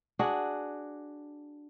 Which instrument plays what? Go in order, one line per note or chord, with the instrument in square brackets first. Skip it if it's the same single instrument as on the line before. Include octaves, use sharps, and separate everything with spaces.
[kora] D4 F#4 G#4